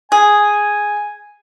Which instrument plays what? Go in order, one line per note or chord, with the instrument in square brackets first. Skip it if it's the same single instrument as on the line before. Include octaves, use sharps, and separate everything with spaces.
[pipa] G#4 [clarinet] G#5